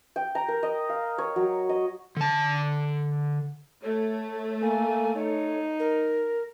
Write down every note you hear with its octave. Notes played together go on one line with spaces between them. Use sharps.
G5
A#5
A#4
D#5
F5
C#5
F#3
D#5
D3 A5
A3 C#5
A#3 G#5
D#4 C#5
A#4